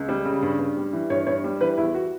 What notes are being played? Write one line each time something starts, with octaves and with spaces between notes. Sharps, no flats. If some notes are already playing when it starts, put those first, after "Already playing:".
Already playing: C#2
G3
C#3
G2
G2
G3
E3
G2 C#5
G2 C#5
G3
E3 B4
E2 E4
F#4